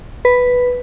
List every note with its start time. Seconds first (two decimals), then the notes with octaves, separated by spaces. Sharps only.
0.25 B4